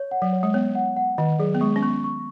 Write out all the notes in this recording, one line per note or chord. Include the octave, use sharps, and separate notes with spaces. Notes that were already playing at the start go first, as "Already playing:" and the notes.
Already playing: C#5
F#5
F#3
C#5
G#3
B3 C#5
F#5
F#5
D#3 D#5
F#3 G#4
B3
G#3 C#6
C#4
B3 C#6
C#6